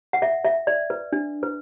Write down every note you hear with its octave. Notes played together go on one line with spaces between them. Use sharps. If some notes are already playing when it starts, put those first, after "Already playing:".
F#5
E5
E5
D5
B4
D4
B4